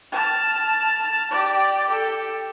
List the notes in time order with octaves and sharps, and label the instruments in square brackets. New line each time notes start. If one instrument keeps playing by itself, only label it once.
[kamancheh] A5 F6
G4 D5
G4 A4